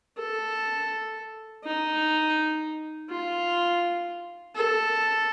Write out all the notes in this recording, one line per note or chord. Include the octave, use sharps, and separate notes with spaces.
A4
D#4
F4
A4